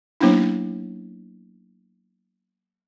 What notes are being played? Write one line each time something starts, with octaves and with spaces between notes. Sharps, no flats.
F#3 A#3 B3 C#4 D4 E4